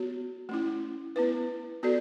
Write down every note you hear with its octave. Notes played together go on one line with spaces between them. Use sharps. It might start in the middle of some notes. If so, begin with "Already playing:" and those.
Already playing: B3 F#4 C#5
A3 C#4 E4
B3 E4 B4
B3 F#4 A4 D5